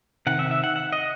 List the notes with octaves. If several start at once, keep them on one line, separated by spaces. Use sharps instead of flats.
C3 D#3 F#5
E5
E5
F#5
F#5
D#5